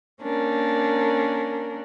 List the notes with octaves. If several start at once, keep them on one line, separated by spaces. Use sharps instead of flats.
A#3 C#4 D4 A#4